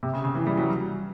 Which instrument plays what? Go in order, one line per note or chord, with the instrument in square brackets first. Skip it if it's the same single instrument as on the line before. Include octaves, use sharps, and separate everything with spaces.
[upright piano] C3
C#3
C#3
E3
G3
F#3